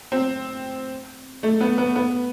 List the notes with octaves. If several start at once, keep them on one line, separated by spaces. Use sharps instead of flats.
C4
A3
B3
B3
B3